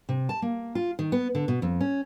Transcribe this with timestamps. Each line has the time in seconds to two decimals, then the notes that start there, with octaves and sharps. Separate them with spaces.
0.09 C3
0.29 A5
0.42 A#3
0.75 F4
0.99 D#3
1.12 B3
1.35 D3
1.48 B2
1.62 F2
1.81 C#4